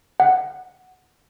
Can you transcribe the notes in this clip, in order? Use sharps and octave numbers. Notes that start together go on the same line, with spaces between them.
F#5